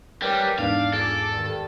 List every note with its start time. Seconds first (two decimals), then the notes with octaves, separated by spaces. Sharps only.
0.22 G3 C#4 A#4 B4 G5 D6
0.59 E2 G#2 D4 F5
0.94 A#2 G#4 A4 D6
1.31 G2 D#3